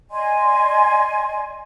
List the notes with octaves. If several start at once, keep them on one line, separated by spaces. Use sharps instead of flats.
D5 D#5 G#5 C6